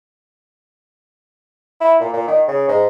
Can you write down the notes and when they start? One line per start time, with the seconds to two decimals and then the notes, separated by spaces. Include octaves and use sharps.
1.81 E4
2.01 A#2
2.13 A#2
2.28 D#3
2.48 C#3
2.68 G#2